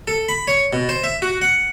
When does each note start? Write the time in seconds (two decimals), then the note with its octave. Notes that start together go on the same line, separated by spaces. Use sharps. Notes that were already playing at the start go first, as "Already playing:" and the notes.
0.08 A4
0.29 B5
0.48 C#5
0.73 B2
0.89 C5
1.04 E5
1.22 F#4
1.42 F#5